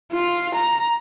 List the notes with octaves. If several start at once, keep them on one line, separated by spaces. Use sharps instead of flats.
F4
A#5